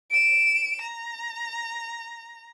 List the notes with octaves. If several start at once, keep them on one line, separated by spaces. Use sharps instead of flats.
D7 E7
A#5